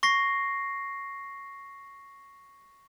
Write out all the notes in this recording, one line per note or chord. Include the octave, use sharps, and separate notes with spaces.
C#6 A#6 C7